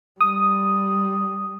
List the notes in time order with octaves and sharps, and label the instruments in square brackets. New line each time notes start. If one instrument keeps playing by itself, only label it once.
[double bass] G3 [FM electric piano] D#6